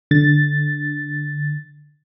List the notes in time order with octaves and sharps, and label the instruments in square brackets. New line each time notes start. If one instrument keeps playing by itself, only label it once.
[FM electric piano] D3 A6